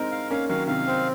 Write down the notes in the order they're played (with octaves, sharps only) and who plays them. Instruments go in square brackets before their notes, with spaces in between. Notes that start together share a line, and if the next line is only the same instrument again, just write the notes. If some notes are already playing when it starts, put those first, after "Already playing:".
Already playing: [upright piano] G#3 C4 D#4 [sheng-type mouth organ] A#4
[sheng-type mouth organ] F5
[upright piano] A#3 C#4 [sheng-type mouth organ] F5
[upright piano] D#3 F#3 [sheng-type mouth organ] F5
[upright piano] C3 D#3 [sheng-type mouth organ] F5
[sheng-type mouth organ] C4